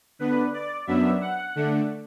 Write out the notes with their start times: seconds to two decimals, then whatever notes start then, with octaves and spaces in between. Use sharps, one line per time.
0.19 D3 B3 D4 B4
0.53 D5
0.87 F#2 F#3 B3 D4 E5
1.21 F#5
1.55 D3 A3 D4